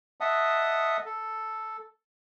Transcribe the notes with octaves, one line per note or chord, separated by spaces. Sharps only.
D#5 E5 F#5 A5 D#6
A4